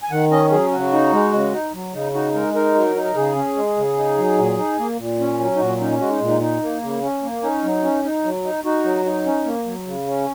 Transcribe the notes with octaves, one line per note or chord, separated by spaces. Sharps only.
G#5
D#3 F#5
C#4 D#5
F#3 G#4
C#3 F#4
D#4
G#3
C#3
D#4
F#3
C#3 D#4
D#4 F#4
G#3 A#4
D#4 A#4
F#3
D#4
A#4
C#3 G#4
C#4
G#3
C#3
D#4
F#3
A#2
D#4
A#3
A#2
C#4
F#3
D#4
A#2 F#4
C#4 D#4
G#3 F#4
D#4
A#2
D#4
D#4
A#3
C#3
C#4
A#3
C#4 D#4
F#3
C#4
D#4
F#3
D#4
D#4 F#4
F#3
D#4
C#4
A#3
F#3
C#3
C#4